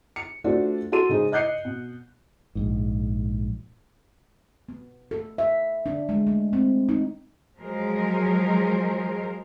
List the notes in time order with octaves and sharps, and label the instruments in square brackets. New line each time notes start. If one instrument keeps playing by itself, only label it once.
[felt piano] C#7
A3 D4 F4 F#4 C5
F#4 A4 C6 D#7
C#3 G#3 D#4 C5
D#5 F#6 G6 C7 C#7
B2
[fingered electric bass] A#1 G#2
[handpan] B3
A4
E5
D4
G#3
A3
C4
D#4
[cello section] F3 F#3 G#3 A#4 C5